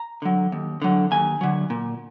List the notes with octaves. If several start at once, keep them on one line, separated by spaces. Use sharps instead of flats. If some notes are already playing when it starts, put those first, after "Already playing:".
Already playing: A#5
D3 F#3
D#2
D3 F#3
D#2 G#5
D3 F#3
A#2